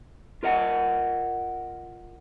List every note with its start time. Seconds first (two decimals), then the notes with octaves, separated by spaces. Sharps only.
0.43 F4 A#4 D#5 F#5